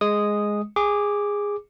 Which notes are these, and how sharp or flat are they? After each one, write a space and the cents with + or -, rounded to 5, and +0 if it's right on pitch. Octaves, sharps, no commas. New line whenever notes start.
G#3 +0 D#6 -5
G#4 -15 D6 +0